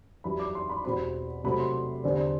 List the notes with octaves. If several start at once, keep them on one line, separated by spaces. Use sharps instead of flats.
F#2 E3 G3 B5
D6
C6
B5
E2 B2 G3 C4 B5
C3 F#3 A3 C4 B5
C6
E2 D3 G3 C4